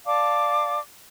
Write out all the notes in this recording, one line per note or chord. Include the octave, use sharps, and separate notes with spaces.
D5 F5 A5 D6